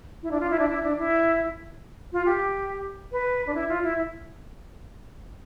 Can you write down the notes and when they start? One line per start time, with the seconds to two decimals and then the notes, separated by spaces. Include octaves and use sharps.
0.22 E4
0.31 D4
0.40 F4
0.50 E4
0.59 D4
0.69 E4
0.83 D4
0.98 E4
2.12 F4
2.25 G4
3.12 B4
3.46 D4
3.54 E4
3.68 F4
3.83 E4